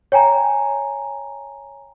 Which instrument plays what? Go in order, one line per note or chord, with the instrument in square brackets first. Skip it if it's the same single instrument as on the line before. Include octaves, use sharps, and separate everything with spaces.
[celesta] C#5 G5 G#5 A#5